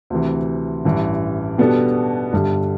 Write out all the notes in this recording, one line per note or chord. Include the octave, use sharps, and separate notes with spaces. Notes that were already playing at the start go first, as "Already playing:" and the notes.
D2 C3 E3
A1 G2 E3
B2 G3 B3 D4 A4
G1 G2 D3 G3